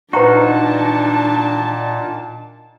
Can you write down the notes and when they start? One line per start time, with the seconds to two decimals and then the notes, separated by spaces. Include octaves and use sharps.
0.13 A#2 D4 D#4 F#4 B4 A5 A#5 C#6